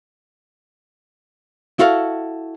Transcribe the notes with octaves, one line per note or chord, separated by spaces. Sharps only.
E4 F#4 A4 F5